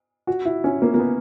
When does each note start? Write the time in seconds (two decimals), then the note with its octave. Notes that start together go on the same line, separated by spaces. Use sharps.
0.27 F#4
0.45 E4
0.64 C#4
0.82 A#3
0.94 A#3
0.99 B3